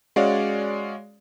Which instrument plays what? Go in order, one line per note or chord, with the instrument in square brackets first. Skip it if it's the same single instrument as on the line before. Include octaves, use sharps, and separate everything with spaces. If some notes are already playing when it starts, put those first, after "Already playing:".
[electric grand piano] G#3 C#4 F#4 C#5 D5 F5